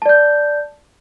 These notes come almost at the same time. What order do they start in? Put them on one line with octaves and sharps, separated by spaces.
A5 D5 G6